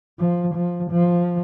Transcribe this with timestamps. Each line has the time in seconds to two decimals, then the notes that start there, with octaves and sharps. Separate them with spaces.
0.19 F3
0.55 F3
0.91 F3